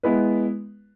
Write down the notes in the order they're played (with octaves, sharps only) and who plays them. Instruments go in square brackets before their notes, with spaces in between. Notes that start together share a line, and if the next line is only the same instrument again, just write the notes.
[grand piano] G#3 B3 E4 B4